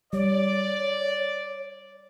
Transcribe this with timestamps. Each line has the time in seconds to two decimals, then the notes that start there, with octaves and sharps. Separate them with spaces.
0.13 G3 C#5 D5